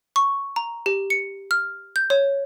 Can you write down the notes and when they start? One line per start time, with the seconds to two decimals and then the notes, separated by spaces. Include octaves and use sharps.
0.16 C#6
0.56 A#5
0.86 G4
1.10 C#7
1.51 F6
1.96 G6
2.10 C#5